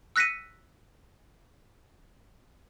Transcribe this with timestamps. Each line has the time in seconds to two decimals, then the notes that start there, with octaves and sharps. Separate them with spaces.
0.16 E6 F#6 A#6 B6 C#7 D#7